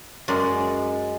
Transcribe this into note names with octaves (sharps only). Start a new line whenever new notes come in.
F#2 G#3 D5